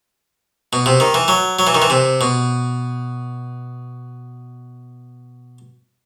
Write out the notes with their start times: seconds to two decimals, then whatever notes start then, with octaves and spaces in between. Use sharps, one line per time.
0.73 B2
0.86 C3
1.00 D#3
1.14 E3
1.28 F#3
1.59 F#3
1.67 E3
1.75 D#3
1.82 E3
1.90 C3
2.21 B2